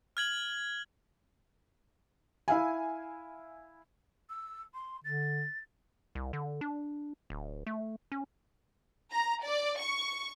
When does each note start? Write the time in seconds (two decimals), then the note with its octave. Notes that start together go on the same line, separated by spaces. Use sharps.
0.17 F6 G#6 F#7
2.48 E4 E5 F5 G#5
4.29 E6
4.74 C6
5.04 D3 A6
6.15 C2
6.33 D3
6.61 D4
7.30 D1
7.67 A3
8.12 C#4
9.12 A#5
9.44 D5
9.80 C#6